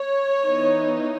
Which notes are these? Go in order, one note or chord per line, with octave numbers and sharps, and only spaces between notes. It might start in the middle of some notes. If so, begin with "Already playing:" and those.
Already playing: C#5
E3 B3 D#4